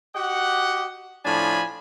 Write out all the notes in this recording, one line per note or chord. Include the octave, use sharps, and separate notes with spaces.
F#4 G4 D#5 F#5
A2 F3 D4 G#5 B5